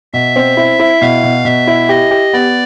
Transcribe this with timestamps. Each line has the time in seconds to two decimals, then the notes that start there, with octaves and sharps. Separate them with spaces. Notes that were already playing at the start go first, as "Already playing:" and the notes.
0.13 B2 E5
0.36 C4
0.57 E4
0.80 E4
1.01 B2 F5
1.23 B2
1.45 B2 E5
1.67 E4
1.89 G4 D#5
2.11 G4
2.33 B3 D5